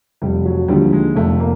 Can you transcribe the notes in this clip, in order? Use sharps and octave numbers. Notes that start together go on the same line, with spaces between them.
F1 G3
F#3
D#2 D3 F3 G3
G#3
F1 A3
A#3